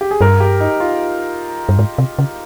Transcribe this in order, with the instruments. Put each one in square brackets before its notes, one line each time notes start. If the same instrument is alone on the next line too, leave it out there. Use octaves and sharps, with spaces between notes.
[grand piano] G4
G#4
[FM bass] G2 [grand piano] A#4
[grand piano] G4
D#4
F4
[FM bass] G2
G#2
C3
C#3